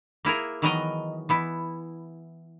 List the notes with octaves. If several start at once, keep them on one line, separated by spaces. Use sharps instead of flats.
A#3 E4 G#4 A#4
D#3 E3 F#3 B3 A#4 D#5
E3 B3 E4